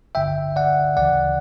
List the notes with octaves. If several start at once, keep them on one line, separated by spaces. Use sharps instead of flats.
G1 G2 D3 E5 G5
D5 F#5
D2 C#3 E3 D5 F#5